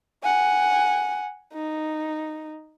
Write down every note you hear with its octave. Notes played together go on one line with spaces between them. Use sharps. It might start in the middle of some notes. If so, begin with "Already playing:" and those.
F#5 G#5
D#4